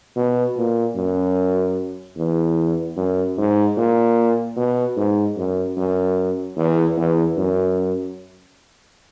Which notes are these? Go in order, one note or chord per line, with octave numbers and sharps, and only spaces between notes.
B2
A#2
F#2
E2
F#2
G#2
A#2
B2
G#2
F#2
F#2
E2
E2
F#2